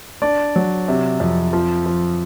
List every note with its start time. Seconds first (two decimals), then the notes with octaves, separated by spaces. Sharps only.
0.22 D4 D5
0.56 F#3
0.88 C3
1.20 F2
1.53 F3
1.86 F3